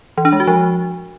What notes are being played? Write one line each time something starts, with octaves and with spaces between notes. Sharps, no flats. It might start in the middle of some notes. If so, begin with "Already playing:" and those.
E3
D4
G#3
F#4
F3